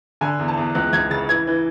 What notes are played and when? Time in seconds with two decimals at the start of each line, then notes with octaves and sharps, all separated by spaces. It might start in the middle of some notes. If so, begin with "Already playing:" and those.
0.21 D3 G#5
0.39 E2
0.48 A5
0.57 E2
0.75 C#2 F#6
0.93 C#2 G#6
1.10 C#3 A6
1.29 E3 G#6
1.47 E3